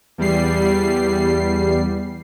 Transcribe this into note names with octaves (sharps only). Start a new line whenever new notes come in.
E2 G3 C7